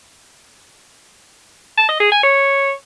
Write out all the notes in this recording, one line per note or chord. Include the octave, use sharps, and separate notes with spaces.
A5
D#5
G#4
G#5
C#5